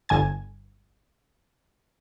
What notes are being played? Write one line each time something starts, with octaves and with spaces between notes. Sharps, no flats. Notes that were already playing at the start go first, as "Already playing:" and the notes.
G1 G#5 G#6